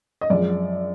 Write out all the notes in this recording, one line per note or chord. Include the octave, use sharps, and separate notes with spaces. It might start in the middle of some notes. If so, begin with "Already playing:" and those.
D#5
F#2 F3 G#3 D5